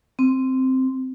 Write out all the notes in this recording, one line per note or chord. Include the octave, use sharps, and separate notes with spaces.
C4